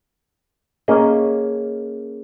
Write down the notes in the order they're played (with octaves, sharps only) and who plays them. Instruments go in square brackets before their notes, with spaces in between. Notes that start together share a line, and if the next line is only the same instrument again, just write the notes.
[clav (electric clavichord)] A#3 C#4 G#4 D#5